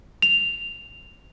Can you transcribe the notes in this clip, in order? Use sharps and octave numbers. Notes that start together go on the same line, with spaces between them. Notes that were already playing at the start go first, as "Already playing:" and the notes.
F7